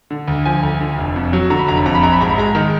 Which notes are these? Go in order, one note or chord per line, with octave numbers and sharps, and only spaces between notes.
D3
D2
F3 G#5
D2
D3
F1
F2
F#3
D3 A#5
B5
F1 A#5
B5
F2 A#5
B5
A#1 A#5
B5
G#2 A#5
B5
G#3 A#5
D#3